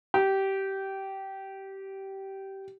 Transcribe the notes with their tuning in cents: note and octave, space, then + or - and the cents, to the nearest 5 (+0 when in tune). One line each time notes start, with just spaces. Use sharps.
G4 -20